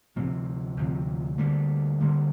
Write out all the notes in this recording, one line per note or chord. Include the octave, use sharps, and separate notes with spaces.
D2 C3 F3 C4
D2 C3 F3 C4
D2 D3 G3 A#3
D2 D3 G3 A#3